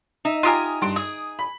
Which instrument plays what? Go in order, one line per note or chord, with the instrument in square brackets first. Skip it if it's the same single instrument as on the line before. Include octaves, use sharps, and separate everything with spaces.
[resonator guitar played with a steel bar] D#4 E5
[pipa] F4 G4 A#4 [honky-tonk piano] G#5 D#6 D#7
[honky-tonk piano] G2 C6 D7
[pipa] G#4 [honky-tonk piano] D#6
[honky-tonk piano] B5